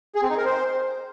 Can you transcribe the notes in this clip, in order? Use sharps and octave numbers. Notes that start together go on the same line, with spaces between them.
G#4
C4
D#4
A#4
C5